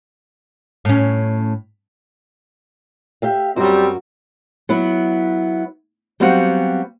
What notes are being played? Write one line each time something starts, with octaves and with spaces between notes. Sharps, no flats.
A2 C#4
G4 E5 F5
F#2 G3 C4 F#4
F#3 B3 E4
F#3 G3 B3 C4 F#4 F5